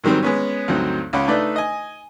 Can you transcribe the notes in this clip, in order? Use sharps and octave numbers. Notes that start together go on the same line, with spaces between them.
G#2 D#3 F#3 G3 C4
G#3 B3 C#4
D2 G2 F#3 C4 D#4
C#2 C#3 F#5 B5
A3 D4 D#4 B4 D5 E5
D#5 G#5